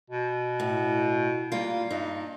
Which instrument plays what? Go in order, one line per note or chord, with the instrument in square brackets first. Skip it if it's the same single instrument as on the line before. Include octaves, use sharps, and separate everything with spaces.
[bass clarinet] B2
[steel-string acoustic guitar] A2
[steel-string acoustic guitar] G3 F4 [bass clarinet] A#3
[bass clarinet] G2 [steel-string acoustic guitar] D#4